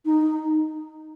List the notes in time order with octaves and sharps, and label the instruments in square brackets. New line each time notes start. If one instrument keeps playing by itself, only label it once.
[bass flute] D#4